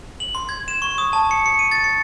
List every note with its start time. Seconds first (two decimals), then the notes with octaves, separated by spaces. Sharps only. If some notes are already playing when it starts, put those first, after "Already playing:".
0.20 F#7
0.35 C6
0.49 G#6
0.68 E7
0.82 C#6
0.98 D#6
1.13 A5
1.31 C#7
1.46 C#7
1.59 D#7
1.72 A6
1.84 C#7